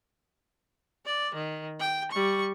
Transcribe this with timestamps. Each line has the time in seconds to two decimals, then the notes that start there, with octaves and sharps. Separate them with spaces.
1.06 D5
1.35 D#3
1.80 G5
2.11 G3 C#6